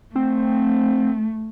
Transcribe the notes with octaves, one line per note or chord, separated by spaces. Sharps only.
A3 C4